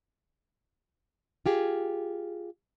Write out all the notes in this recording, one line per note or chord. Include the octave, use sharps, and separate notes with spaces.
F4 G4 G#4